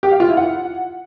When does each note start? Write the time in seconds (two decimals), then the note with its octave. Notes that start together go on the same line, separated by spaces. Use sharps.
0.03 G4
0.12 F5
0.20 F4
0.29 E4
0.37 F#5